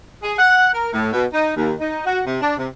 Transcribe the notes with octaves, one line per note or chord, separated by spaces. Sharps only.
G#4
F#5
A#4
A2
B2
D#4
D#2
D#4
F#4
C3
D4
C3